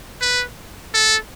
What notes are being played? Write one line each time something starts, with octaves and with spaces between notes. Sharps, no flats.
B4
A4